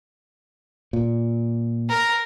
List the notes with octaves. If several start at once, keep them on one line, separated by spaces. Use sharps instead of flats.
A#2
A#4